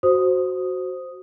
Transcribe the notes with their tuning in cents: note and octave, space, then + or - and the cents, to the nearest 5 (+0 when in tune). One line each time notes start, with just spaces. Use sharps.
F#4 +0 C5 +0 D#6 +0